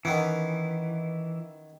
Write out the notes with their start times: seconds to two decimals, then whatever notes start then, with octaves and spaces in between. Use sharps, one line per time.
0.05 D#3 E3 B3 C#4